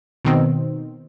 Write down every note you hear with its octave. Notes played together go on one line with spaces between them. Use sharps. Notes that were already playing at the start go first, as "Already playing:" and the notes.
B2 D#3 C4